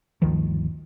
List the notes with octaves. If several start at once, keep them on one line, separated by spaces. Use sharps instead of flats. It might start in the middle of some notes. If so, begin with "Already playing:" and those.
G1 D2 D#3 F3